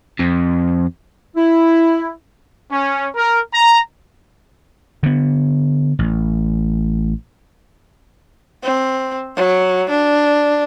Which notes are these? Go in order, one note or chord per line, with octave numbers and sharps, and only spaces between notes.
F2
E4
C#4
A#4
A#5
D3 B3
A1
C4
F#3
D4